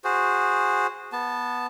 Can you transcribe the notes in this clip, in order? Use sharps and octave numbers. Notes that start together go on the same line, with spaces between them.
F#4 G#4 C5
B3 A5